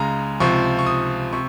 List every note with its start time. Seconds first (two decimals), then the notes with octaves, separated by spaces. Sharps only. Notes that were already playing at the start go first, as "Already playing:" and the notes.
Already playing: C#2 C#3 G#3 A#5
0.40 C#2 C3 F3 C#6
0.79 C#6
0.86 D#6
1.33 C3 C#6